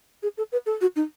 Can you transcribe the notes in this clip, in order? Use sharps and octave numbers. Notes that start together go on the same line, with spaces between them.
G#4
A4
B4
A4
F#4
D#4